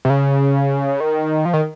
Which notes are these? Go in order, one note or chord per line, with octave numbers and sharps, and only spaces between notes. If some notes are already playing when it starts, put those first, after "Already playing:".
C3
C#3
D#3
F3
D#3